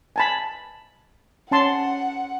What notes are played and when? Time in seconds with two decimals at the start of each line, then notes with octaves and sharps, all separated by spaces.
0.16 G#5 A5 B5
1.51 C#4 F#5 A5 C6